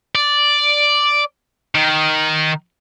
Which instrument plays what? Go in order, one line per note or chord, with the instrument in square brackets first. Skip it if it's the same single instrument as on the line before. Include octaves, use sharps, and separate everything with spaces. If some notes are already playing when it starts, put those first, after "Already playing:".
[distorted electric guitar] D5
D#3